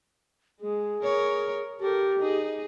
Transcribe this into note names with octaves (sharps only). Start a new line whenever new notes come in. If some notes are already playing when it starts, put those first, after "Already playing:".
G#3 G#4
A#4 C#5
G4 A4 A#4
D#4 G#4